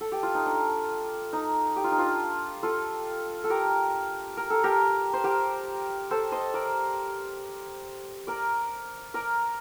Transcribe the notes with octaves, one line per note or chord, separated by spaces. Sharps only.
A4
G4
F4
D#4
D4
D#4
G4
F4
D#4
D4 F4
F4 A4
A4
G4 A#4
A#4
A4
G4 A#4
C5
G4 A#4
A4 C5
C5 D#5
A#4 D5
A#4 D5
A#4 D5